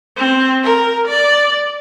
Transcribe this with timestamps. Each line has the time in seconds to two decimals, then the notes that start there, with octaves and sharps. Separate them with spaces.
0.17 C4
0.63 A#4
1.07 D5